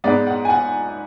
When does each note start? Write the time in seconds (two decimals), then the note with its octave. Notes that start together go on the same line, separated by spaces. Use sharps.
0.04 G#2 G#3 B3 D5
0.27 F#5
0.45 G#5
0.50 F#5